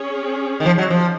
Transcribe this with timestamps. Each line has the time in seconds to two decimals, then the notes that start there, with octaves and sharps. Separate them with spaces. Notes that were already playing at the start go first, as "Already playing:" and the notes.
Already playing: C#4 G#4 C#5
0.60 D#3
0.66 F3
0.78 F#3
0.90 F3